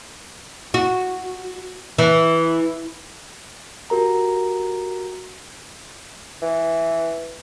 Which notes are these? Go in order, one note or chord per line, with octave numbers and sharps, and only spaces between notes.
F#4
E3
F#4 G4 A#4 A#5
E3